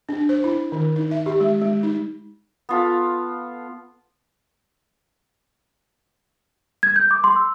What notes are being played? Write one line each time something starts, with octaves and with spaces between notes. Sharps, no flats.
D4
C5
E4
D#3
D#4
E5
G4
G#3
G#3
D#4
B3 F4 A4
G#6
G6
D6
C6
E6